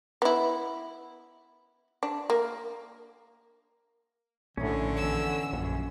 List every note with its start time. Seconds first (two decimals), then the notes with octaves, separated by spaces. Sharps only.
0.22 B3 E4
2.03 D4
2.30 A#3
4.57 A#1 A2 D3 C#4
4.96 E2 E6
5.53 A#1 F#2